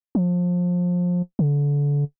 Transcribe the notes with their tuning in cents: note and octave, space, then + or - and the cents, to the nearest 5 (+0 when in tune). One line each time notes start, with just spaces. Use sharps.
F3 +25
D3 -30